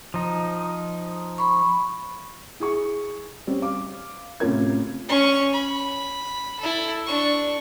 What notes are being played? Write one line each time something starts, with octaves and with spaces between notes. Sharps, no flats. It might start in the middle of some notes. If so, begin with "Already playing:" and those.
F3 D#4
B5 C#6
E4 G#4 C#6
G3 C4 C#4
F5 D6
A2 C3 C#4 F4 A#4 G#6
C#4 C#6
B5
E4 A4
D4 C#6